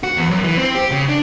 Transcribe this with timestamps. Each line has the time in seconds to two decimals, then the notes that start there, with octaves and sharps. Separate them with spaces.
0.03 F#4
0.17 E2
0.30 F#2
0.44 E3
0.57 C4
0.75 G4
0.92 C#3
1.09 D4